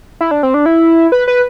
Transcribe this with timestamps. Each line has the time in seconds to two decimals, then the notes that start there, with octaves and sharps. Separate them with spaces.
0.21 E4
0.31 D4
0.43 C4
0.54 D4
0.66 E4
1.12 B4
1.28 B4